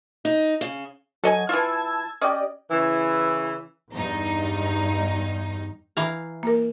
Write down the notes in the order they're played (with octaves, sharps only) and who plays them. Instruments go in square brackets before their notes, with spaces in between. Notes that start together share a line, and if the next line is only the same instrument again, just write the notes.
[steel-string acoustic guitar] D#4
C#3
[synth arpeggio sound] F#3 [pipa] A4 D#5 G#5
[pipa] E3 F4 [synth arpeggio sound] A5 E6 G#6
[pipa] C#4 [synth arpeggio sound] G4 D5 D#5
[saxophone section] C#3 E3
[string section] E2 G2 D#4
[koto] E3 F5 A#5
[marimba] A#3 A#4